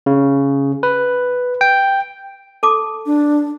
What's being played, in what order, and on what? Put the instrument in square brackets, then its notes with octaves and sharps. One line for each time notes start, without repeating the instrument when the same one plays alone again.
[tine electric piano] C#3
B4
G5
[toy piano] A4 A5 D6
[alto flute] D4